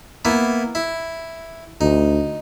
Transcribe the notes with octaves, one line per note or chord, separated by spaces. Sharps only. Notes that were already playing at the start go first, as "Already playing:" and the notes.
A#3 B3 E4
E4
D2 D#4